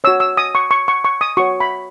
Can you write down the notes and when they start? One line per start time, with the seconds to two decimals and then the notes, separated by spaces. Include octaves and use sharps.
0.04 F#4 C#5 E6
0.20 E6
0.37 D#6
0.55 C#6
0.71 C#6
0.88 C#6
1.05 C#6
1.21 D#6
1.37 F#4 C#5 C#6
1.60 B5